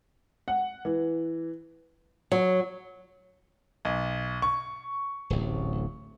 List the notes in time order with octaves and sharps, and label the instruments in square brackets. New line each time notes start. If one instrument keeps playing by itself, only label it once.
[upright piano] F#5
E3
[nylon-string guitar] F#3
[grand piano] B1
C#6
[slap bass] D1 A1